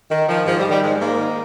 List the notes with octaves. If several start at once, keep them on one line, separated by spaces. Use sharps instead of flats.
D#3
D#3 F3
G#2 F3
G3
D#3
G3
G#2 G#3
G#2 A#3
D#3